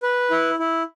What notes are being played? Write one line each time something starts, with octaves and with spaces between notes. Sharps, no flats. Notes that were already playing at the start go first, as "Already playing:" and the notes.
B4
E4
E4